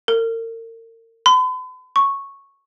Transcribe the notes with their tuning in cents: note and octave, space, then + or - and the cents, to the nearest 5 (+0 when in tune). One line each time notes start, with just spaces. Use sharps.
A#4 -40
B5 +45
C#6 -5